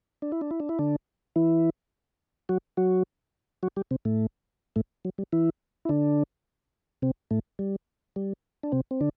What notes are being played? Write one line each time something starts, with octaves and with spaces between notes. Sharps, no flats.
D4
E4
D4
E4
D4
E4
D3 D4
E3 E4
F#3 F#4
F#3 F#4
F#3 F#4
G3 G4
C3 C4
A2 A3
A2 A3
F#3
G3
E3 E4
E4
D3 D4
C3 C4
A2 A3
G3
G3
D4
C3 C4
C4
D3 D4